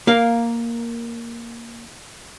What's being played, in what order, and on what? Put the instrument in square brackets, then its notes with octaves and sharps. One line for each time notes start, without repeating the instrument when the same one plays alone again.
[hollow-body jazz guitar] A#3 A#4 F5